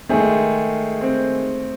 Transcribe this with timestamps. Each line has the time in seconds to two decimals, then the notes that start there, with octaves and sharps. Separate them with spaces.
0.09 D#3 G#3 A3 D#4 G#4
1.01 C4